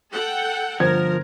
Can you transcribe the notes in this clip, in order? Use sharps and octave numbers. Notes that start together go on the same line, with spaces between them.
A4 F#5 G5
G1 F3 A#4 C5 G#6